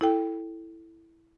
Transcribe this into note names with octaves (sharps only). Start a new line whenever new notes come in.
E4 A4 G5